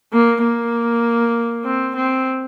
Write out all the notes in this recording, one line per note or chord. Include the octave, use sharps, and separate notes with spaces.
A#3
A#3
C4
C4